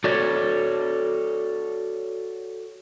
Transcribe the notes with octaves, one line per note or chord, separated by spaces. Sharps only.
F#4 A4 C#5 D5